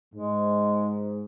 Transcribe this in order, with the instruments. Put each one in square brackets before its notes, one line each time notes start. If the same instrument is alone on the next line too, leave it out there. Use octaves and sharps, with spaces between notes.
[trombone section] G#2 [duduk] G#3